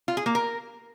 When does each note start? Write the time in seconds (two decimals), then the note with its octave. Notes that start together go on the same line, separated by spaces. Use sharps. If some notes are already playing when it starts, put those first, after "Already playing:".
0.08 F4
0.17 G#4
0.26 A#3
0.35 A#4